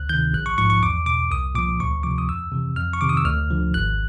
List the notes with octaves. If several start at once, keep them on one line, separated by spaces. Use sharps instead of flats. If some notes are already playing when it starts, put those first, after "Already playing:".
Already playing: D2 F#6
C3 D#3 G6
A#1 F#6
C#6
G#2 F3 C#6
C#6
E2 D6
B2 D6
C2 D#6
A#2 F3 D6
D2 C#6
C3 F3 D6
D#6
F2 E6
C3 E3
F2 F6
C#6
C3 D#3 D6
D#6
E6
D2 F6
D3 F3
G#1 F#6